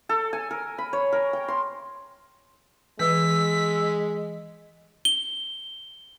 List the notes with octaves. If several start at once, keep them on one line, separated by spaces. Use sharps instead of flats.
A4
G#5
A#4
B5
C#5
A#4
G5
C6
E3 G#3 B4 E6 B6
G7